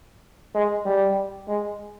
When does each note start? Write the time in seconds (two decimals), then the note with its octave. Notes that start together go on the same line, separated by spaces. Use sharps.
0.55 G#3
0.86 G3
1.48 G#3